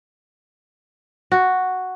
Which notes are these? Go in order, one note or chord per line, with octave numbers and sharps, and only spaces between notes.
F#4